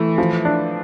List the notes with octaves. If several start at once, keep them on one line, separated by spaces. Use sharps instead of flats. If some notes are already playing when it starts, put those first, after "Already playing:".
Already playing: E3 A3
F3
D4